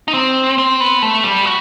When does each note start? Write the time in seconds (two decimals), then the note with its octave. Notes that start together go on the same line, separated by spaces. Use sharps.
0.08 D#4
0.14 C4
0.58 C4
0.80 B3
1.02 A3
1.24 G3
1.46 F#4